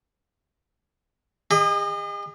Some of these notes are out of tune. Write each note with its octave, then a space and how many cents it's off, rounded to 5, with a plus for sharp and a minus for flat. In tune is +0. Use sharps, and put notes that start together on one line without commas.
G#4 -45 D#5 -15